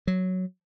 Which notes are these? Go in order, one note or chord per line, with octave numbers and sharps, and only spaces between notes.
F#3